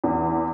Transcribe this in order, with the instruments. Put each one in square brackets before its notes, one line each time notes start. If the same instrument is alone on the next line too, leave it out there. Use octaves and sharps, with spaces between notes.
[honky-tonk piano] E2